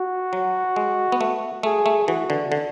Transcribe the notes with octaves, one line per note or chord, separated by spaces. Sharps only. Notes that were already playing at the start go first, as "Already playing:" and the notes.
Already playing: F#4
F#3
G#3
B3
A3
A3 G#4
A3
E3 F#4
D3
D3